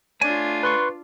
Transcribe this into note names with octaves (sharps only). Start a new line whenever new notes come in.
A3 D4 F4 C#5 G#5
B4 C6 C#6